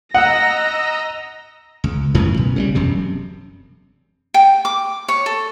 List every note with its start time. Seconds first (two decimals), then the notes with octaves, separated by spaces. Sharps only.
0.14 D#5 F#5 A#5 E6 A#6
1.84 C#2
2.15 F#2 A2 C#3 E3
2.37 B1
2.56 C#3 E3 G3
2.75 E1 F#2 C3
4.34 G5
4.65 D6
5.08 C#5
5.26 A4